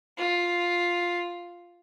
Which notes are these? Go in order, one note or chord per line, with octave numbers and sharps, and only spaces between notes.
F4